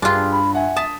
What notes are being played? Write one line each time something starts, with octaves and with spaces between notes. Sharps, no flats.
G2 D4 F4 G4 G#4 C6
B5
E5 F#5 G#5
A5 D#6 B6